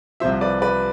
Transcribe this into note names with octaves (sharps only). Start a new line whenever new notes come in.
C2 C3 F3 C5 E5
B4 D5
B4 D5